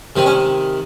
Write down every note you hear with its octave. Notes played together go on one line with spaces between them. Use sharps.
C3 D#3 C4
C#4